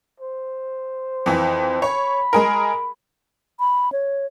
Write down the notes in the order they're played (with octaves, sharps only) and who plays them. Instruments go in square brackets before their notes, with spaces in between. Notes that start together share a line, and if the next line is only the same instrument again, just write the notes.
[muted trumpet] C5
[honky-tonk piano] F2 E3
[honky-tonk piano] C#5 [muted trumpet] B5
[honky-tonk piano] G#3 G#4 A#4
[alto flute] B5
C#5